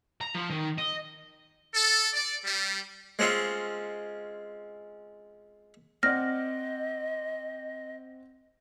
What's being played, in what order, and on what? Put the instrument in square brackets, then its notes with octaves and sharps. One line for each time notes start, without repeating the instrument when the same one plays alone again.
[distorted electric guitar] A#5
F3
D#3
D#5
[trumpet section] A4
D5
G3
[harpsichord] G#3 C4 C#4 F4
[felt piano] C4 D5 F#5 [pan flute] D#5 [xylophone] F6 A#6